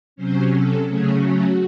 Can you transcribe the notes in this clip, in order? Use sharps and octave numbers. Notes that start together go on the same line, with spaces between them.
C3 F#3 C#4 C5
A4
C#3 F#3 A3 C#4 G#4
F#4